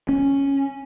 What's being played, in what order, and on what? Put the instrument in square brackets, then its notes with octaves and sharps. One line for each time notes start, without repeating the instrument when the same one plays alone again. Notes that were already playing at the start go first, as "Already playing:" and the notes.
[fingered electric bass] C#4